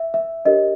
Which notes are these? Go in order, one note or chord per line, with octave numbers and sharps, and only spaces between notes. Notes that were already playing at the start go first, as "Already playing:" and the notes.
Already playing: E5
E5
D4 G4 A#4 C#5 D#5